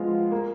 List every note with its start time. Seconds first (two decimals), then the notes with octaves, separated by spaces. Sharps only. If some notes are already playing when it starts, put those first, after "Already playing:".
Already playing: F3 G#3 B3 F4
0.32 A#3